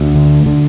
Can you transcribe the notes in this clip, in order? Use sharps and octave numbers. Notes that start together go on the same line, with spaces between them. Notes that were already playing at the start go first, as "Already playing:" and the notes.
Already playing: D2
D3
D3